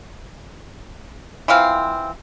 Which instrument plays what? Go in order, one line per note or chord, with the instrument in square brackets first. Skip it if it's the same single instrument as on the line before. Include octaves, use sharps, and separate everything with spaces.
[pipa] E3 F3 C4 F5